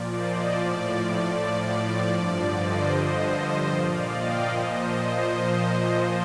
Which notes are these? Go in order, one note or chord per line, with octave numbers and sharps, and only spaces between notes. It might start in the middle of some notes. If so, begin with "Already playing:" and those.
Already playing: A#2 F3 D5
C5 D#5
A2 F3 D5
A2 F3 D5
G2 D3 F3 D5
C5 D#5
G2 D3 F3
A#2 F3 D5 F5
D#5 G5
A#2 F3 C5 D#5
A#2 F3